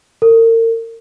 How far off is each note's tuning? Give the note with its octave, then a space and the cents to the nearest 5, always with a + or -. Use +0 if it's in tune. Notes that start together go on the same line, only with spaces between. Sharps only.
A#4 -40